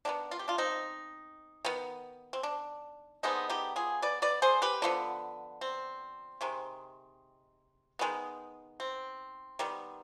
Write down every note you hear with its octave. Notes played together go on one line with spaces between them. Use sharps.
D#3 G3 B3 D4
F4
G4
D4 F4
C4 D#4
D#3 B3
C4
D4
D3 G#3 B3 C4 D#4
D#4 G4
F4 G#4
B4 D5
B4 D5
G#4 C5
G4 B4
D3 F3 B3
C4
C3 D#3 G#3
D#3 G#3 B3
C4
D#3 G3 B3